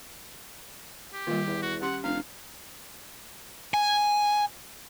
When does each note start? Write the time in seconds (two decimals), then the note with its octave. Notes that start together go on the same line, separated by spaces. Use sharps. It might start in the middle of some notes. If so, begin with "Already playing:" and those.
1.13 G4
1.27 A#2 D#3 G3
1.47 E2
1.63 F#4
1.82 C#4 G4 F#5 C6
2.04 F1 D4 F5
3.74 G#5